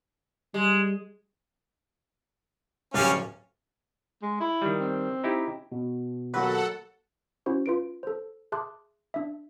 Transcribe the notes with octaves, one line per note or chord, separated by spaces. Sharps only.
G3 G#3
D1 G3 C#4 F5 D6 A6
G#3
E4
D#3 G3
C4
D#4 E4 G4
B2
D#2 F#3 F#4 A4 B4 F#5
C#4 E4 F#4 C5
F4 B4 D7
A4 C5
G#4 E5 A5 C6 D6 F#6
D4 E5